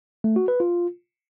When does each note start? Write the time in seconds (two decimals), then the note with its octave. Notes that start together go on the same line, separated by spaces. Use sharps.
0.24 A3
0.36 F#4
0.48 B4
0.60 F4